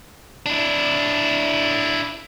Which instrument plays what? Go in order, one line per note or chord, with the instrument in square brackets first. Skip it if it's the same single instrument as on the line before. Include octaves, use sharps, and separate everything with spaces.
[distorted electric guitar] D4 E4